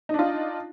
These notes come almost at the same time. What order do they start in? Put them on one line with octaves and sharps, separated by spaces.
D#4 D4 F4